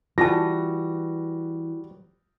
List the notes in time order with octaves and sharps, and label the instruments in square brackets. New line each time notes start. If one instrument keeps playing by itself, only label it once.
[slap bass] E3 [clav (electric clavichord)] G3 F#4 [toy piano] F4 A5 [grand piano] A#6